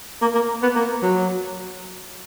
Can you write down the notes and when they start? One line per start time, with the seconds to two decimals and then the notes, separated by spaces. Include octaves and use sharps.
0.22 A#3
0.35 A#3
0.62 B3
0.76 A#3
1.02 F#3